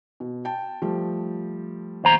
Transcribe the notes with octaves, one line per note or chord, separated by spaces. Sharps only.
B2
G5 A5
F3 G3 A3
D#2 C5 A#5